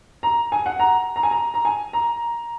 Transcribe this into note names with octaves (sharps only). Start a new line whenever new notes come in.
A#5
G#5
F#5
A#5
A#5
G#5
A#5
A#5
G#5
A#5